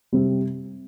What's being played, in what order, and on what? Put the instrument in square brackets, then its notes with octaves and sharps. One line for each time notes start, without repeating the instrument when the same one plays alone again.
[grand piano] C3 G3 C4